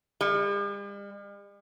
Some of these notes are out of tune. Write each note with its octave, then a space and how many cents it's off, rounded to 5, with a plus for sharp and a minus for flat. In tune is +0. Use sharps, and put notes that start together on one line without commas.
G3 +45